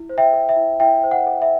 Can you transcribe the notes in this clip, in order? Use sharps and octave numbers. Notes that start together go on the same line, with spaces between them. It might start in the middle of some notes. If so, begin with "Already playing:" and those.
Already playing: E4
C5
E5 G5
A4
E5
E4
E4 E5 G5
C5
F#5
A4
E5